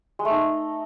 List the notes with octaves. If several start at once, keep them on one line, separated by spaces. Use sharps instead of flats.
G#3
A3
D#4